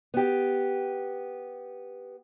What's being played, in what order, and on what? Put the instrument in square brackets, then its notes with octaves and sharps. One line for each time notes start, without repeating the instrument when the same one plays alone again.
[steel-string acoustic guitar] B3 G4